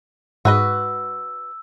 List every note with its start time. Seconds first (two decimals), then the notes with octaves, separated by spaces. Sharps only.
0.45 G#2 F#4 B4 D#5 E6